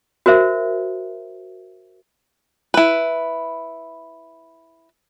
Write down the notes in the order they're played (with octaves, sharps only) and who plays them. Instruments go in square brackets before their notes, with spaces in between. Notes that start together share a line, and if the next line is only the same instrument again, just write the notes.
[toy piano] F#4 A#4 C5 E5
[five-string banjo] E4 B4